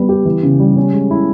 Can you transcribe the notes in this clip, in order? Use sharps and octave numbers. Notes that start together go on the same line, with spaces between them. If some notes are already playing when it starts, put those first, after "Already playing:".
Already playing: G3 B3
G4
E3
C#3
G3
C#4
G#3
E4